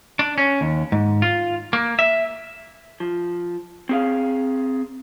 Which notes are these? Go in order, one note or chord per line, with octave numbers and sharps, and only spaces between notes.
D4
C#4
D#2
G#2
F4
A#3
E5
F3
C4 G#4 F5